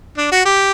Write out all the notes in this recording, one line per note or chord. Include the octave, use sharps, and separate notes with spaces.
D4
F#4
G4